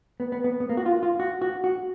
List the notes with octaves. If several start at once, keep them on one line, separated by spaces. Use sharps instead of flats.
B3
B3
B3
B3
A#3
F#4
F4
F4
F#4
F#4
F#4